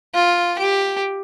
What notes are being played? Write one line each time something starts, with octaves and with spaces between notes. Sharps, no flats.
F4
G4